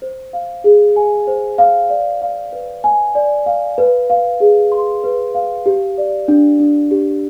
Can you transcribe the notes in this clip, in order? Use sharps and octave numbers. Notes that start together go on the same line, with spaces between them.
C5
F5
G#4
G#5
C5
F5
D5
F5
B4
G#5
D5
F5
B4
F5
G#4
C6
B4
F5
G4
D5
D4
D4
G4